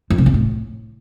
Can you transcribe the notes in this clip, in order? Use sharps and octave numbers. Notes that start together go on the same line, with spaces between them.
F2
C3
E2
A2